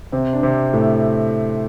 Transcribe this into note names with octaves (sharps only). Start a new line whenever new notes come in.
C3 C4
D4
C3 C4
A2 A3